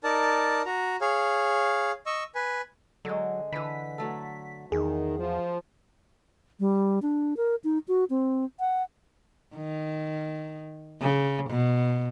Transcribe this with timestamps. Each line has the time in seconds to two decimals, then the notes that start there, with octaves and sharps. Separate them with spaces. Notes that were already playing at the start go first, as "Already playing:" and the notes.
0.04 D#4 A#4 D5 A5
0.66 F#4 A#5
1.01 G#4 C#5 F5
2.06 D#5 C#6 E6
2.35 B4 G#5
3.05 D3 F#3 G#3
3.52 D3 E3 B4 B6
3.98 F#3 A3 A4
4.72 E2 D#3 G#4
5.19 F3
6.60 G3
7.02 D4
7.37 A#4
7.64 D#4
7.88 F#4
8.10 C4
8.60 F#5
9.56 D#3
11.01 C#3
11.50 B2